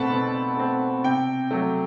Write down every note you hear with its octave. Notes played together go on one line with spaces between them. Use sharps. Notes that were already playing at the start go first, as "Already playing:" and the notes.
Already playing: B2 A3 C4 F#5 A5 B5
B2
A3 C4
C3 G5
F#3 A3